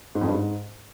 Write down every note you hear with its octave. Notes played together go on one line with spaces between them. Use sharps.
G#2
F2
G2
G#2